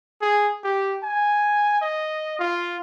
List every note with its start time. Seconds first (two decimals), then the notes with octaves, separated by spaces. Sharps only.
0.22 G#4
0.64 G4
1.03 G#5
1.82 D#5
2.39 F4